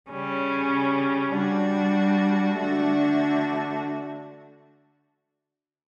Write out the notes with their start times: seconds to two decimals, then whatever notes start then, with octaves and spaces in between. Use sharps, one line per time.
0.11 C#3 G3 C#4
1.35 G3 D4 F#4
2.60 D3 A3 D4 F#4